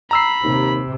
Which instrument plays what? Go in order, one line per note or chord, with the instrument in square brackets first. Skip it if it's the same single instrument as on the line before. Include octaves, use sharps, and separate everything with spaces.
[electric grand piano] A#5 E6 C7 [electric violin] B5
[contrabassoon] D#2 [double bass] C3